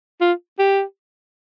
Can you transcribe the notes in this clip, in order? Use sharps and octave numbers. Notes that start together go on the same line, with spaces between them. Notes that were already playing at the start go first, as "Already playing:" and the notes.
F4
G4